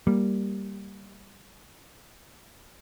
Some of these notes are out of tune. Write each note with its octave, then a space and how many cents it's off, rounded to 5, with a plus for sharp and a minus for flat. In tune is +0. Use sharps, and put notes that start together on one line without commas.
G3 +0 A#3 +0